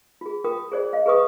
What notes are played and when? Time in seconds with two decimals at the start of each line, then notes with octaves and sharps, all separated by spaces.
0.21 F4 G#4
0.44 F4 A#4 G5 D#6
0.72 G#4 C5 D5
0.93 D#5 F5
1.06 G#4 B4 C#6 D#6